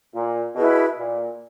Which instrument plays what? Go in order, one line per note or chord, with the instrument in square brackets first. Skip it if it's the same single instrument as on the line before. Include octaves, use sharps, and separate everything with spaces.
[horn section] A#2
[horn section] B2 [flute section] E4 G#4 B4
[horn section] A#2